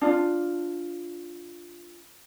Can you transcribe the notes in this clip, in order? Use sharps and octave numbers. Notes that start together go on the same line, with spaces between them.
D4 F4